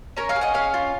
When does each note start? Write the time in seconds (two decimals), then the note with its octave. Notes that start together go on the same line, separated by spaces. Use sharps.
0.17 C#4 A#4 C#5
0.29 C#5 F5
0.36 G#4
0.41 D#5 F#5
0.54 C#4 C#5 F5
0.74 F4